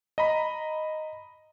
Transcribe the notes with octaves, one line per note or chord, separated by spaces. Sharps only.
D#5 A#5 B5